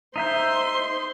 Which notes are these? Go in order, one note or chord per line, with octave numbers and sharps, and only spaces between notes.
D#4 C5 E5 C6 G6